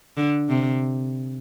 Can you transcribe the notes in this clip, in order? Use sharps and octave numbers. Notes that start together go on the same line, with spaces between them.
D3
C3